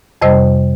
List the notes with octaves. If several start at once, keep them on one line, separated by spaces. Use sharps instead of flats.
F2 C3 G3 C5 D#5